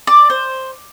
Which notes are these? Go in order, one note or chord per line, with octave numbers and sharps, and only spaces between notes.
D5
C5